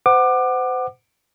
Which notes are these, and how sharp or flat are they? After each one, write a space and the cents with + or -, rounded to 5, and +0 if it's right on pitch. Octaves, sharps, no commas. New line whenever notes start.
C5 -35 F#5 +5 D6 +25